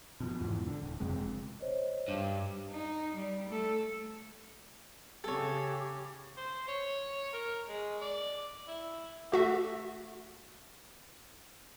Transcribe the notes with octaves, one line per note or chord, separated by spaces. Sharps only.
B2 F3
E2 G#2 B2 E3
D3
D#1
F#1 F2 C3 G#3
C5 C#5 D#5
G2
D#4
G3
A3 A4
C#3 G4 A4 C#5
C5
C#5
A#4
G#3
D5
E4
A3 F#4 E5